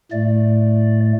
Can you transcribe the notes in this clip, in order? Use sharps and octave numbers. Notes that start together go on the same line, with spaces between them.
A2 A3 D5